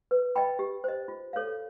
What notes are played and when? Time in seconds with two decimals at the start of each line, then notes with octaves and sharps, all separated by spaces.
0.11 B4
0.36 D#5 G5 B5
0.59 G4
0.84 C5 D#5
1.08 F4
1.33 A4 C#5 F5